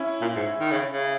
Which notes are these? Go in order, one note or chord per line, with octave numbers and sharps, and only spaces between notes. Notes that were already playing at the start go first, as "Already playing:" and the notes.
Already playing: C#4 E4
A#2
G#2
D#3
C#3
C#3